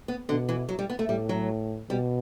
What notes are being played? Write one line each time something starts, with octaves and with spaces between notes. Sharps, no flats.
B3
B2 D3
E3
F#3
G3
B3
A3
A2 G3
F#3
B2 G3